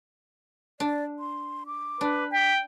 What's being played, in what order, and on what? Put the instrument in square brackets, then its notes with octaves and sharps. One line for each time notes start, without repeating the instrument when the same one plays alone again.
[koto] D4 [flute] D5
[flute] C6
D6
[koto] D4 [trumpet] B4
[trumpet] G5 [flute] B6